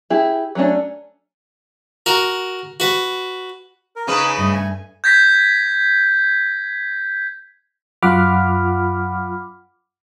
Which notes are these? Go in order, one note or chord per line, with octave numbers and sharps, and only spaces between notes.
E4 G4 G#4
F#3 A3 C#4 D4
F#4 A#4
F#4 B4
A#4
C#3 C#4 D#4 G#4 B4
G2 A3 D#5
G#5
G6 G#6 A#6 B6
F#2 F4 F#5 B5 D6 F6